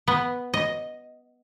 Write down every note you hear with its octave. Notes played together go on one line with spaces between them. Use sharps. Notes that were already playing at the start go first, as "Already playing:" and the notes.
B3
D#5